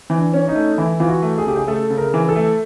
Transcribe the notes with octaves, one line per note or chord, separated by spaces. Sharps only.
E3
D4
C#4
D#4
A3
E3 E4
E3 F4
F#4
A3
G#4
C#3 G4
G#4
A3 A4
C#3
A#4
E3
A4
A3